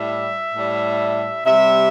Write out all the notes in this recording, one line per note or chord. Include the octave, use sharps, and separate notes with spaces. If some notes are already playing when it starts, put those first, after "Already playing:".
Already playing: A2 G3 E5
A2 G3
C3 G3 E5